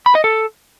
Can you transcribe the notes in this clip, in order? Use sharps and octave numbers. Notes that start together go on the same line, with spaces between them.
B5
D#5
A4